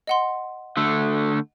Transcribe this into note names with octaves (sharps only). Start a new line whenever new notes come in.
D#5 F#5 C6
D3 A3